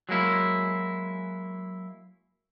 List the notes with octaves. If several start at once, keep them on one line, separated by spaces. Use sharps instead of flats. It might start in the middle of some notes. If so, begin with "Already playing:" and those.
F#3 G#3 A#3 E4